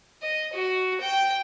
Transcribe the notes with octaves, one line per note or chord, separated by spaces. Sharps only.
D#5
F#4
G5